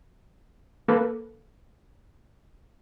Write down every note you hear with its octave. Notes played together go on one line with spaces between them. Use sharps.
A#3 A4 B4